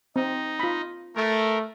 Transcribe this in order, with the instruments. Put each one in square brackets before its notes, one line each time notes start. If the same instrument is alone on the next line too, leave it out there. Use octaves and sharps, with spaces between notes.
[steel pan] C4 [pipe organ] D#4
[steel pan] F4 B5
[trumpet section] A3 [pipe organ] A#4